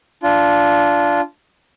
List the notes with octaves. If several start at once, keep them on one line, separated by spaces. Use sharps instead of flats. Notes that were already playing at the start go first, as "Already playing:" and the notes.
D4 F4